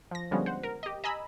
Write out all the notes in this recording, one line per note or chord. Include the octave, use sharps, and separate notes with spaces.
F3 A#6
D3 F3 G3 G#3 B3 C#4
C5 F#5
A#4
G4 D#5
D#5 G#5 A#5 B5 E6